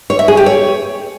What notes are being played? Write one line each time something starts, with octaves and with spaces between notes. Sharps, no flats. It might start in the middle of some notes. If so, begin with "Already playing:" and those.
C#5
E5
G#4
G4
C#5